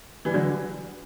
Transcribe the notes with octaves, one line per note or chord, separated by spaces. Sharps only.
E3 G3
D3 F#3